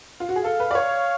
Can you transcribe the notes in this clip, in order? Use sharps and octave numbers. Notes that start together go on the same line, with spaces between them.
F4
F#4
G#4
A4 F5
B4
D5
C#5